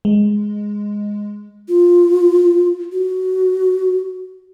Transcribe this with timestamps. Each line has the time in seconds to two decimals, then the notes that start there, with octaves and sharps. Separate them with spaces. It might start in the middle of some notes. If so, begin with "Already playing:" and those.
0.05 G#3
1.68 F4
2.92 F#4